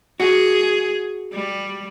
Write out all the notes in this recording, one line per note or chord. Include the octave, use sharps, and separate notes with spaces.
F#4 G#4
G3